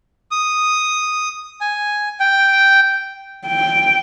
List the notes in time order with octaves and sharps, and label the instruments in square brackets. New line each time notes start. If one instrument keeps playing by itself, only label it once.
[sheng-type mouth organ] D#6
G#5
G5
[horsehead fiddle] G5